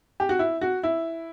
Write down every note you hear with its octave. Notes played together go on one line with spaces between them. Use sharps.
G4
F#4
E4
F#4
E4